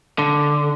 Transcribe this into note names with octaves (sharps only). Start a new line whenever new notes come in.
D3